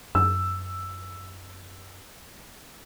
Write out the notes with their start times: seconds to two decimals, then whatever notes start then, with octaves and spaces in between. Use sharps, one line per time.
0.15 F#2 E6